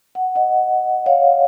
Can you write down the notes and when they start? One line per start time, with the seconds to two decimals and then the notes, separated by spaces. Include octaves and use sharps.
0.15 F#5
0.35 D#5 F#5
1.06 C#5 F5